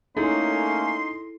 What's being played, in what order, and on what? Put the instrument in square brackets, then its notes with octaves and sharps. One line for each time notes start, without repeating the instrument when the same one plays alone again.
[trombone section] A3 A#3 C#4 [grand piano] D#4 [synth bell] E4 G#4 A4 [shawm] C6